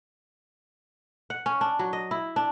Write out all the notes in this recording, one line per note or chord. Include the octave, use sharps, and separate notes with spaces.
F#5
C#4
D4
F#3
D#5
E4
D4